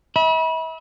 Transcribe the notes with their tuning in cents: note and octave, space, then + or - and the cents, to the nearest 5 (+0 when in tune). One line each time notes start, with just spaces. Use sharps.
E5 -40 B5 -30